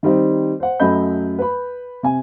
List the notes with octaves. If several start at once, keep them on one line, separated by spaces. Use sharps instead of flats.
D#3 G3 C4 D#4
C5 F#5
F#2 F#3 A3 D#5 B5 G6
B4 B5
C3 G#5